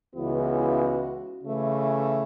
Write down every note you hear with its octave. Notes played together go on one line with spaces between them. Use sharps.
C#2 C#3 E3 B3 E4 F#4
C#3 E3 A3